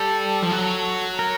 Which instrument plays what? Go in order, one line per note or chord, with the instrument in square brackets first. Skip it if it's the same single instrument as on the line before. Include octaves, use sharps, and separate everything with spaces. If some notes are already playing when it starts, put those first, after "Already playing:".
Already playing: [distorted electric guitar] G3 [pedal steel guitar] A4
[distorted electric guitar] F3
F#3
[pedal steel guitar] A#4